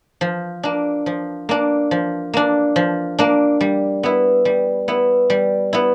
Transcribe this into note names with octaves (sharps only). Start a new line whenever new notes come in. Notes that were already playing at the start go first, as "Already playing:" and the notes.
F3
A#3 D4
F3
A#3 D4
F3
A#3 D4
F3
A#3 D4
G3
B3 E4
G3
B3 E4
G3
B3 E4